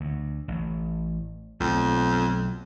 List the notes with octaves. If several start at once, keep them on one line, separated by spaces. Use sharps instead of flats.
D2
A1
B1 F2 F#3 A3